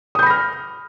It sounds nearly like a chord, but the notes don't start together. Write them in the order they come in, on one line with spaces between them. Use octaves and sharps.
D#6 G6 B5 A#6 F6